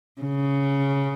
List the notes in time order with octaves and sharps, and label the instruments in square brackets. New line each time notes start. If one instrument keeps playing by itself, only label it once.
[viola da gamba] C#3